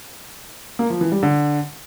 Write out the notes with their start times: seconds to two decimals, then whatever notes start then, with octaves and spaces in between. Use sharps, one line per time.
0.79 A#3
0.90 F3
1.01 E3
1.12 G3
1.23 D3